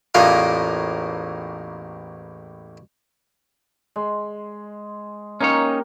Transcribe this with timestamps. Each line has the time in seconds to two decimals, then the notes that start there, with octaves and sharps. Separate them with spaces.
0.15 A1 E2 A2 A#3 F4 A#4
3.96 G#3
5.41 A#3 C#4 D#4 G4 C#5